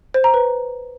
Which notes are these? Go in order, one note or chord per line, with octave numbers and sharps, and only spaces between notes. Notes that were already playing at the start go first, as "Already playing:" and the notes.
C5
A#5
B4